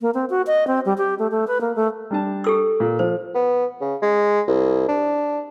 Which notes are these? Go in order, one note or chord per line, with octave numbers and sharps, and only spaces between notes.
A#3
C4
F#4
D#5
C4
G3
G4
A3
A3
B4
A#3
A3
G3 D4 A5
G4 A4 E6
A#2
F3 F4 C5
B3
C#3
G#3
C2
D4